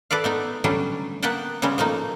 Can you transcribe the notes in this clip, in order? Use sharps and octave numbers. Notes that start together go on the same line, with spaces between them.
A4 B4 D5 F5
A3 B3 D#4
D3 F#3 G3 A3 C#4 D4
A#3 B3 B4 F#5 G5 A5
C#3 G3 G#3 B3 C#4
F3 A3 A#3 D#4